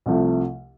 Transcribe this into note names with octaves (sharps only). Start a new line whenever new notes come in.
C2 C3 F3 A3